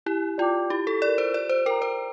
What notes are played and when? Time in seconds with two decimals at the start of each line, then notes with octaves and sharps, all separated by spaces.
0.06 E4 G4
0.38 F4 D5 G5 D6
0.70 E4 G4
0.87 A4
1.02 G4 D5
1.06 A#4
1.18 C5
1.34 C5 D5
1.49 C5
1.66 A#4 G5
1.70 A#5
1.82 C5